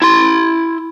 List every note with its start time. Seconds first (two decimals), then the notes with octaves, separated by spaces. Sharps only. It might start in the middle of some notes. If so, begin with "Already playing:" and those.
0.02 E4 C6